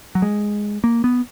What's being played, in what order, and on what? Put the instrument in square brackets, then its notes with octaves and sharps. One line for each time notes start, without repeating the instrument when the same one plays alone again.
[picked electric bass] F#3
G#3
A#3
B3